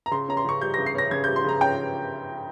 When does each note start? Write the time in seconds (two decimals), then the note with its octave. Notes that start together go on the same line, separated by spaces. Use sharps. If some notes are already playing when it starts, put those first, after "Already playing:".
0.06 A#5
0.11 C#3 C6
0.28 C#4 A#5
0.37 C6
0.45 C#3 C#6
0.61 G3 G6
0.74 C#3 A#6
0.86 C7
0.95 C#4 A#6
1.11 C#3 G#6
1.24 G3 G6
1.36 C6
1.44 C#3 A#5
1.61 C#4 G5